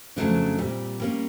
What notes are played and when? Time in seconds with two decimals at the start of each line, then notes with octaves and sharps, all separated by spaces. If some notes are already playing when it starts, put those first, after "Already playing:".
0.16 F2 C#3 F#3 A3 D4
0.58 A#2 G3 C4
1.00 G3 A#3 C#4